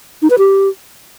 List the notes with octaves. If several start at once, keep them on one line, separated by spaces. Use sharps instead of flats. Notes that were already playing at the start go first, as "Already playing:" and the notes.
D#4
B4
G4